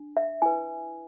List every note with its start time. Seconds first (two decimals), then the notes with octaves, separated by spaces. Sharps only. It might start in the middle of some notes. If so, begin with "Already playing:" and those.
Already playing: D4
0.17 E5
0.42 E4 B4 G#5